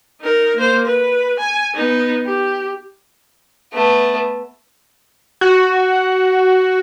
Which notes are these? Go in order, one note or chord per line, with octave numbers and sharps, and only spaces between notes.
D#4 A#4
A#3 C5
B4
G#5
B3 D#4
G4
A3 B3
F#4